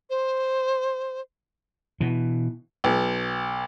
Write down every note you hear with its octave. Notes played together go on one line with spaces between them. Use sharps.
C5
B2 E3
B1